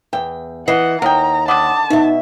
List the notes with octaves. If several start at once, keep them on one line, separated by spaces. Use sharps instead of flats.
E2 G5
E3 D#5 F#5 C7
D#2 A#4 F#5 G5 A#5 D#6
D3 D#3 F#5 A5 B5 D6 D#6
B2 D#4 E5